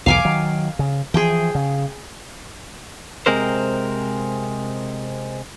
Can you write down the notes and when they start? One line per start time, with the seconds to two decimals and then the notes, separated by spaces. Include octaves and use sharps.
0.06 B1 E2 F5 G#5 D6
0.25 D#3 F#3
0.79 C#3
1.14 E3 F3 G#4 G5
1.55 C#3
3.26 C3 G#3 C4 A#4 C5